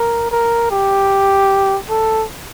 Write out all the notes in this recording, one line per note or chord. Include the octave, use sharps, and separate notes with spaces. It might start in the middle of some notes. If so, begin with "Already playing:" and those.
Already playing: A#4
A#4
G4
A4